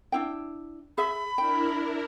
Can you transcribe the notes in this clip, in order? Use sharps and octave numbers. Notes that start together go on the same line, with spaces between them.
D4 E4 G5
G#4 E5 B5
D4 E4 A#4 G5